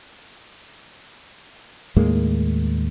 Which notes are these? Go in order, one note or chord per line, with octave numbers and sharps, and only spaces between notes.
D#2 A2 G#3 A#3